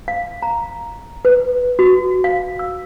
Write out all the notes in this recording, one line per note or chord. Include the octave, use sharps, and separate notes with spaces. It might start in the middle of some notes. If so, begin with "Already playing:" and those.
F5
A#5
B4
F#4
F5
E6